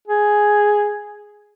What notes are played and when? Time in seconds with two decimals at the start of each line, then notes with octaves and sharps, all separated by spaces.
0.07 G#4